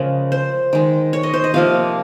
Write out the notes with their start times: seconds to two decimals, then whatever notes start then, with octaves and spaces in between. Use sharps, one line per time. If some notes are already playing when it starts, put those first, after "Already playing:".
Already playing: C#3 F3 G#3 A#4
0.32 C5
0.73 D#3 G#3
1.13 C#5
1.23 D#5
1.34 C5
1.44 D#5
1.54 C3 F3 A#3 F5